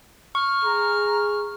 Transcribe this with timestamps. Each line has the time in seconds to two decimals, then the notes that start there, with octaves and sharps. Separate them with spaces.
0.35 C#6 F6
0.65 G#4 A#5